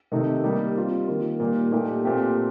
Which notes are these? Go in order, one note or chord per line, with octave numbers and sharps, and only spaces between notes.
C3 D#3 A3 D#4
G3 A#3 D#4 G4
G3 C4 F4
D#3 A#3 F4
A#2 G3 A#3 D#4
A#2 A3 D#4 G4
A#2 A3 C4 G4